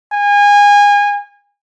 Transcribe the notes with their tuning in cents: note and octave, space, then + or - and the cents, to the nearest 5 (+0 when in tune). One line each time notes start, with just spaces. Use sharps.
G#5 -25